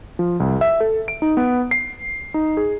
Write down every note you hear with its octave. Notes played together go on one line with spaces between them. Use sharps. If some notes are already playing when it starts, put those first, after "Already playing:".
F3
C2
E5
A4
D7
D#4
B3
C7
D#4
G#4